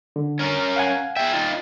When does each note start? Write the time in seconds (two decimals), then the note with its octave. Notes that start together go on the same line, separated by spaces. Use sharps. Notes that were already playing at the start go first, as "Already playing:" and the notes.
0.16 D3
0.39 C#4 A#4
0.76 F5 F#5 G#5
1.17 G#4 E5 G5
1.33 D#4 F4